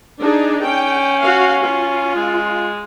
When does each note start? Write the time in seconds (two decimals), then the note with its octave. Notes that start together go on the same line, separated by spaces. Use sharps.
0.20 D4 D#4 G#4
0.63 C#4 G5
1.21 F#4 F5
1.63 F4
2.16 G#3